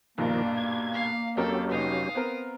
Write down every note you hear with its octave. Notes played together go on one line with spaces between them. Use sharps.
B1 G2 A#2 D#3 F3 A#3 D4 A#4
G#6
F5
F2 F#3 C#4 G4 A4 A#4
F1 D#4 F5 D#6
B3 C4 A#4